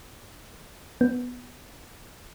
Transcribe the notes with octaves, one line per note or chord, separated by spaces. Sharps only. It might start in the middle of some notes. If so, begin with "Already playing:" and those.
B3